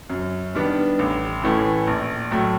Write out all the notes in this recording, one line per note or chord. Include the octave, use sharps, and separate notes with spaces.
F#2
D#3 G3 B3 D4
A1
A2 E3 A3 C#4
A#1
A2 F#3 A3